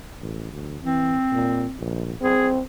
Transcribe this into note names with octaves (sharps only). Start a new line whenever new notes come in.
A1
D2
E3 C4
A#2
A#1
C4 G#4